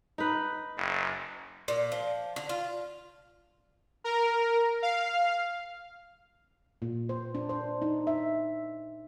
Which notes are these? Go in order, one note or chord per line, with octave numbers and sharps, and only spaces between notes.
D#4 B4
F#1
A#2
F3
D3
F4
A#4
F5
A#2
C5
D4
C5
D#4
E5